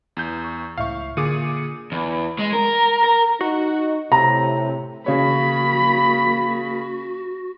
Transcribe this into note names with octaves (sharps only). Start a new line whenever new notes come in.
E2 G6
C#6
C#2 A2 E5 F5 C#6
A#2 D3 G#4 D6 C#7 D#7
E2
G#3
A#4
A#4
D#4 F#4
A2 C3 A#5
C#3 A#3 F#4 C#5 B5